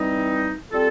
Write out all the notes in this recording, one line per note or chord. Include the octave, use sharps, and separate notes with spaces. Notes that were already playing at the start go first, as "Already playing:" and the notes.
Already playing: E3 G3 C4 D#4
G3 C4 F4 A4